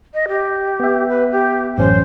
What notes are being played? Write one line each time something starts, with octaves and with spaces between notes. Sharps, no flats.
D#5
G4
B3 E5
B4
G4
A1 F#2 C#4 C5